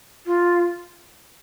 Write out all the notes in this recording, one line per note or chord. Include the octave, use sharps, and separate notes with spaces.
F4